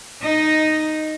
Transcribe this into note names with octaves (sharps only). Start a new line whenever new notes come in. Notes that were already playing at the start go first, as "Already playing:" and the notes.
D#4 D#5